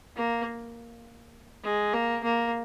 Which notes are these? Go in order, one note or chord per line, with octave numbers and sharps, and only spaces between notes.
A#3
G#3
A#3
A#3